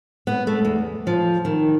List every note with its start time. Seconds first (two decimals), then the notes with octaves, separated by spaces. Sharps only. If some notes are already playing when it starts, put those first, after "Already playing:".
0.27 B3
0.47 A3
0.65 E2
1.07 F3
1.45 D#3